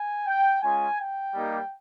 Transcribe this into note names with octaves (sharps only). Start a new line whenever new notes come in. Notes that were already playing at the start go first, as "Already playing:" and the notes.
Already playing: G#5
G5
G#3 C#4 F4 G#5
G5
G3 A#3 D#4 G4